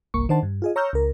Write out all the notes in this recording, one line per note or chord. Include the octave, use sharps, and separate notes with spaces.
G1 C2 A#3 C#6
D#3 D4 C5 F#5 A5
G2
F4 G#4 D#5
C#5 A#5 C#6 E6 F6 G6
C#2 A#4